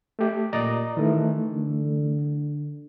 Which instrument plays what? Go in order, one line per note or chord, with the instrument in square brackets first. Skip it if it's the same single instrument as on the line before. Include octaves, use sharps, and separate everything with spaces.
[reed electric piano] A3 G4
[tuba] A#2 [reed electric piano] D5 D#5 A#5
[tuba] D#3 [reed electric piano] E3 A3
[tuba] D3